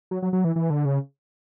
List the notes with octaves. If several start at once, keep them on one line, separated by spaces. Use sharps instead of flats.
F#3
F#3
F#3
E3
E3
D3
C#3